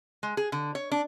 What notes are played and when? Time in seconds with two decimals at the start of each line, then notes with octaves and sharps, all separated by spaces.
0.23 G#3
0.37 G#4
0.52 D3
0.75 C#5
0.92 D4